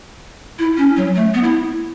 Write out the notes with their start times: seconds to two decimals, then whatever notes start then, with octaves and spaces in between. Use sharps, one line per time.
0.59 E4
0.77 C#4
0.96 F#3
1.15 A3
1.34 B3
1.44 E4